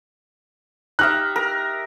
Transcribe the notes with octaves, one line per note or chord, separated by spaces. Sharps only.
D#4 G4 E5 F6 F#6
A#4